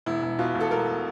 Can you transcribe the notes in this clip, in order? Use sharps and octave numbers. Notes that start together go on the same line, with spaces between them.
E1 E4
E1
B2 F4
E1
A4
B2 A#4